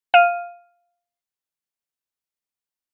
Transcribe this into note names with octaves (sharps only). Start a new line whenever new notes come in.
F5 F6 D#7